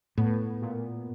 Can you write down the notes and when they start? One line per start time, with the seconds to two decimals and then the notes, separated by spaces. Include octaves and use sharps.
0.17 A2 B3
0.62 A#2